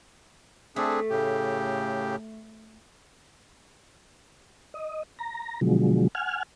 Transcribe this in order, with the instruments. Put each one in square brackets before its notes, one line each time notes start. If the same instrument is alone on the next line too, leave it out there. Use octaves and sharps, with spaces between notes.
[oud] A3 [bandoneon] C4 D4 G#4
[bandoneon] A2 C#3 G4
[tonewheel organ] D#5
A#5
B2 D3 F3 F#3 G#3
F#5 G#5 F6